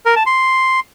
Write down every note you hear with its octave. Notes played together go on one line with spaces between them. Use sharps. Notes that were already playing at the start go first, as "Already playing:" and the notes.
A#4
A5
C6